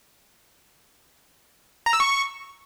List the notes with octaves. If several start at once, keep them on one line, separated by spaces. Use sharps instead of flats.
A#5
E6
C#6